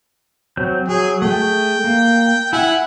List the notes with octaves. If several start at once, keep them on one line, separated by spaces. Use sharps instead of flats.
F#3 C4 G6
F#3 G#4
A3 G#4 G5
A#3
E4 E5 F#5 G#5